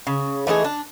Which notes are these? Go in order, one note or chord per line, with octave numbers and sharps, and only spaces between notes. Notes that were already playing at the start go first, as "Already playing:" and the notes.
C#3
E3 A3 D#4 G#4
D4